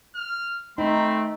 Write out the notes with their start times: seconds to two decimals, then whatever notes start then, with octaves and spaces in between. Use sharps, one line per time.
0.15 F6
0.78 A3 C4 D#4 B5